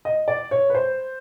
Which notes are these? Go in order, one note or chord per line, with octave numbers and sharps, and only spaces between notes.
D#5
D5
C#5
B4
C5